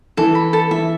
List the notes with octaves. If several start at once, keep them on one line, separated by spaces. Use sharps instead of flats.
E3 E4 A4
B5
A4
E3 E4 E5